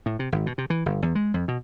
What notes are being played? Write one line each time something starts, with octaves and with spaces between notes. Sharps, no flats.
A2
C3
G#1
B2
C3
E3
G1
E2
G#3
F2
B2